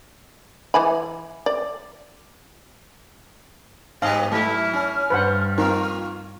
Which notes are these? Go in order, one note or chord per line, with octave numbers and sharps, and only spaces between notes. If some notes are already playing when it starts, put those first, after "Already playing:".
E3 G#5 B5
D5
G#2 B3 G4 B4 D#5 F5
F#3 A3 E4 F6
C#4
G2 B4 C5 F#5
A#3 C4 D#4 F4 A#4